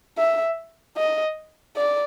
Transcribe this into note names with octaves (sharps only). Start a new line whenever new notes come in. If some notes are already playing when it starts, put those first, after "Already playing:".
E5
D#5
D5